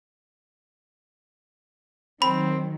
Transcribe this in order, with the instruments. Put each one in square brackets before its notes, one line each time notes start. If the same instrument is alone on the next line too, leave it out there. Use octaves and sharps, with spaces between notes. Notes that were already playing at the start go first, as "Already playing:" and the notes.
[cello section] D#3 F#3 [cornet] C4 [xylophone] B5